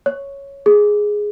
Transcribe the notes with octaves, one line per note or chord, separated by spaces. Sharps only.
C#5
G#4